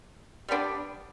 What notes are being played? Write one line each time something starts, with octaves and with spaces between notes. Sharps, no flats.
G3 B3 D4